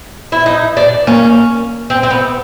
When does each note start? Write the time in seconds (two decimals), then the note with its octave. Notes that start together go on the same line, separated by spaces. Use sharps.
0.32 E4
0.46 D#4
0.77 D4
1.07 A#3 C#4
1.90 C4
2.03 C4
2.10 B3